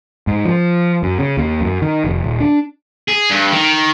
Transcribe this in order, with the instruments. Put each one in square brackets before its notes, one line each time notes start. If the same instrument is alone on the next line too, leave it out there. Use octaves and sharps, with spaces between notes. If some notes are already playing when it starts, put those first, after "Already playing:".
[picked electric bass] G#2
F3
F#2
C#3
D#2
F#2
D#3
F1
D#1
D4
[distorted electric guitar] G#4
G2
D#3